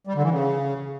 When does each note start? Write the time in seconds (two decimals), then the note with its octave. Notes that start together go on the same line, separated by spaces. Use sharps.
0.07 G3
0.15 D3
0.23 E3
0.31 C#3